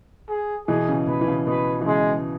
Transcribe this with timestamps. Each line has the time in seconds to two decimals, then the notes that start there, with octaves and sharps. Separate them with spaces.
0.29 G#4
0.68 B2 E3 G#4
0.89 C#3
1.07 B2 B4
1.21 E3
1.28 C#3
1.47 B2 B4
1.81 E3
1.86 C#3 G#3